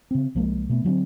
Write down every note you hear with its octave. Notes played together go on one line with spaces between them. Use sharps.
C#3 C4
C2 F3 G#3 A#3
B2 A3 B3
D3 F#3 B3 C4